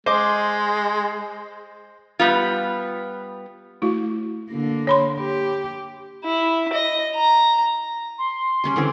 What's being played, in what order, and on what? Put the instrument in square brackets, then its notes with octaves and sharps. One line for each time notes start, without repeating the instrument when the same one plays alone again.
[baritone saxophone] G#3 [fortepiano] C5 D#5 D6
[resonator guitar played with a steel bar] G3 B3 F4
[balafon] A3 E4 F#4
[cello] D3 A#3
[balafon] C#5 B5 C6
[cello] G4
[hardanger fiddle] E4
D#5
A#5
[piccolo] C6
[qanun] G3 C#4 G#4
D3 E3 C4